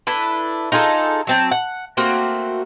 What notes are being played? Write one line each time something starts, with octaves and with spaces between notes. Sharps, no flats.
D4 E4 A4 B4
D#4 F4 G#4 A4
F#3 C4 A5
F#5
A3 A#3 C4 F#4